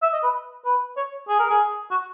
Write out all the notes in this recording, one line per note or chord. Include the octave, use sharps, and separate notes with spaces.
E5
D#5
B4
B4
C#5
G#4
A#4
G#4
F#4